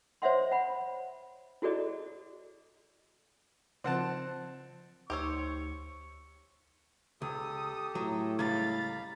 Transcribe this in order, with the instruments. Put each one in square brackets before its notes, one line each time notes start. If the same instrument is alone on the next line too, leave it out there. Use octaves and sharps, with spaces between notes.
[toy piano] C5 C#5 D#5 E5 F#5 C6
F#5 B5
E4 F#4 G#4 A4 D5 D#5
[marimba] C#3 F3 F4 [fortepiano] C4 F#5 A5
[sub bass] D2 [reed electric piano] D#4 E6 [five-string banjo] G4 C5 C#5 [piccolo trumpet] C#6
[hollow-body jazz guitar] C#2 [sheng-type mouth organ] G4 A4 [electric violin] D#6
[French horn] A2 [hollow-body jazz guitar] F#3
[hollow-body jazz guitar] C#2 G3 [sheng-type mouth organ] F5 A#5 B5 [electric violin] A6